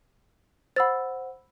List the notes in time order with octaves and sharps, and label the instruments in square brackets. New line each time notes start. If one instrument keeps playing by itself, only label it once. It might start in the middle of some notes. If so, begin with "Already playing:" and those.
[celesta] C5 F#5 [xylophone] B5 E6 A6